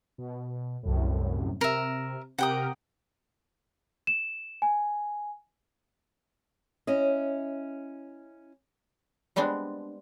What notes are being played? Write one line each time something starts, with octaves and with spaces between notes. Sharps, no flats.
B2
C2 F#2 A2
C3 A#4 E5
C3 G4 A#4 F#5 G5 D#6
E7
G#5
C#4 E4 D#5
G3 G#3 B3 C4 D4